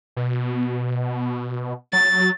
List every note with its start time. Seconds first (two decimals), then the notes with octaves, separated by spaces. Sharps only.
0.16 B2
1.93 F#3 A6